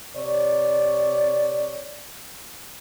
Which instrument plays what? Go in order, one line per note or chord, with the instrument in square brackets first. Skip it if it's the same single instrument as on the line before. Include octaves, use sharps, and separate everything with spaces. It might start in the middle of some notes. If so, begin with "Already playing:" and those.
[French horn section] C3 C#5 D5